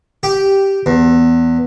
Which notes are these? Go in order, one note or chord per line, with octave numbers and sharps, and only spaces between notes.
G4
E2